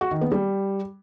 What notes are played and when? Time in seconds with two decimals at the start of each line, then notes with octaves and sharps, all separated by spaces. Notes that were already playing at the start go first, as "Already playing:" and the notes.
0.01 F#4
0.11 D#3
0.21 B3
0.32 G3